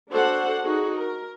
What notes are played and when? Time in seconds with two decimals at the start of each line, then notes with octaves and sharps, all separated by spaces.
0.11 D4 F#4 A4 C5 F#5
0.64 D#4 F#4 G#4
0.96 A#4